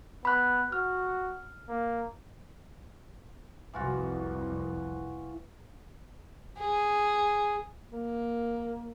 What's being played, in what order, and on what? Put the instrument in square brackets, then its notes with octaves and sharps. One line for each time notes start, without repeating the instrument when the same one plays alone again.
[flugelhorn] B3 [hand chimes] B5 F#6
[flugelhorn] F#4 [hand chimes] F6
[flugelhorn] A#3
[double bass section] C2 F2 [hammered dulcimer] E3 F4 F#4
[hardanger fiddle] G#4
[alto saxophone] A#3